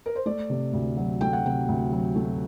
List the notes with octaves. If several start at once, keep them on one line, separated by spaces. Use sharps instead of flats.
A#4
C5
A3 D5
C3
D2
F#3
A3 G5
F#5
C3 G5
D2
F#3
A3